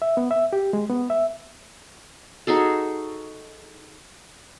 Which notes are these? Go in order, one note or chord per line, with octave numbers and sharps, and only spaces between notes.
E5
B3
E5
G4
G#3
B3
E5
D#4 F#4 G#4 A4